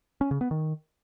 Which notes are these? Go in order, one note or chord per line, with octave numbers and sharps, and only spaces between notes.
C#4
C#3
B3
D#3